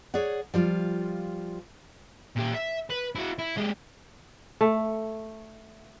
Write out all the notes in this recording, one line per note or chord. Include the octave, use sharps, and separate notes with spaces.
G#4 C#5 D5 F#5
F3 G3 F4
A#2 G4
E5
B4
E4 F#4
E4
G#3 G4
A3